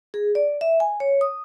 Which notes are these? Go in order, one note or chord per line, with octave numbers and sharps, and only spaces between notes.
G#4
D5
E5
G#5
C#5
D#6